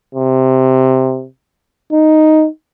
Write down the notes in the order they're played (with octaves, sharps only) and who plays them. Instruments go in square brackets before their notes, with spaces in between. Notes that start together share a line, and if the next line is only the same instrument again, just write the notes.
[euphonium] C3
D#4